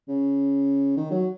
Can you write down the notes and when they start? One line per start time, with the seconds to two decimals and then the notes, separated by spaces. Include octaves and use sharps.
0.08 C#3
0.97 D#3
1.11 F#3